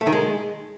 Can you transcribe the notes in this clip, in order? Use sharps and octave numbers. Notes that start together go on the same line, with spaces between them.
A3
D#3
G#3